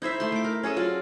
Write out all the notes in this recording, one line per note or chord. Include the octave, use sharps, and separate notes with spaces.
D#4 E4 C5 E5
A3 C6
A3 D6
A#4
C#4 G#4 A4 D#5
F#3 F4 D5